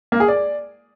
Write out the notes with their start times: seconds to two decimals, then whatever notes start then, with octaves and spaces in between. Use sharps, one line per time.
0.12 A#3
0.20 G#4
0.28 D5